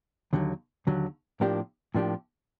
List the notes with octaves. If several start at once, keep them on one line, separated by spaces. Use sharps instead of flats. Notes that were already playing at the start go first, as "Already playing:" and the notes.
D#2 D3 F#3
D#2 D3 F#3
A2 F3 A#3 D4 G4
A2 F3 A#3 D4 G4